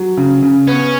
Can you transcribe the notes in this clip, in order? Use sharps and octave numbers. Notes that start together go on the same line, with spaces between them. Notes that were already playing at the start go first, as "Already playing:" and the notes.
Already playing: F#3
C#3
C#3
B3 C#4